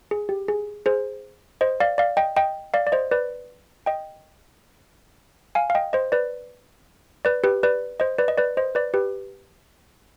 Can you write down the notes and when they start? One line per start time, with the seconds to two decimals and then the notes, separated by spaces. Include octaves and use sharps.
0.11 G#4
0.29 G4
0.48 G#4
0.86 G#4 C5
1.61 C5 D#5
1.80 D5 F5
1.98 D5 F5
2.17 D#5 G5
2.36 D#5 G5
2.74 D5 F5
2.87 D5
2.92 C5 D#5
3.11 B4 D5
3.86 D#5 G5
5.55 F5 G#5
5.70 F5
5.75 D#5 G5
5.93 C5 D#5
6.12 B4 D5
7.25 B4 D5
7.44 G4 B4
7.63 B4 D5
8.00 C5 D#5
8.18 B4 D5
8.28 D#5
8.38 B4 D5
8.57 C5 D#5
8.75 B4 D5
8.94 G4 B4